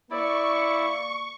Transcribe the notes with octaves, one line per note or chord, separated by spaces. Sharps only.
A#3 E4 D5 C#6